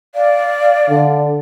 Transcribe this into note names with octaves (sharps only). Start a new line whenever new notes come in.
D5 F5
D3